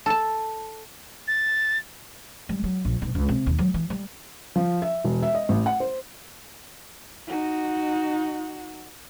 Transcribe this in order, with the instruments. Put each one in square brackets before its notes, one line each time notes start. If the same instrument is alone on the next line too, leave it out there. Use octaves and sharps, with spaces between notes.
[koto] A4 A5
[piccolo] A6
[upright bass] G3
F#3
A#1
B1
C#2
C3
D#2
F#3
E3
G3
[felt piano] F3
E5
E1
E5
D#5
A1
F#5
C5
[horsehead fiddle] D#4 F#4